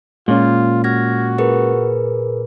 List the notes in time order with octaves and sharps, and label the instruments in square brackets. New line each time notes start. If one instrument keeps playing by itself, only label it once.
[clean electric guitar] A#2 [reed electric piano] G#3 C#4 [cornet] F4
[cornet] F#4 [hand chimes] F6 G#6 A#6
[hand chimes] G#4 A#4 B4